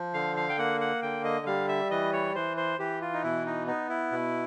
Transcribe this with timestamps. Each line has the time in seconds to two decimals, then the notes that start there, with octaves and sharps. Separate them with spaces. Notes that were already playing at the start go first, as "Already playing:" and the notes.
Already playing: F3
0.14 D3 F5
0.37 F5
0.49 G5
0.58 A#3 F#5
0.81 F#5
1.02 D3 G5
1.24 D#5
1.46 G3 F5
1.68 E5
1.91 E3 D#5
2.13 C#5
2.35 E3 C5
2.57 C5
2.79 E3 G4
3.02 F4
3.13 D#4
3.24 B2 E4
3.46 D#4
3.67 B3 D#4
3.90 E4
4.12 B2